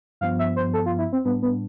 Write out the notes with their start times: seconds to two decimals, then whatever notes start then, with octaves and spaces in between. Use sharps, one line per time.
0.21 G2 F3 B3 F5
0.39 E5
0.56 C5
0.74 A4
0.86 F4
0.98 E4
1.12 C4
1.25 A2 G3 B3 D4
1.42 B3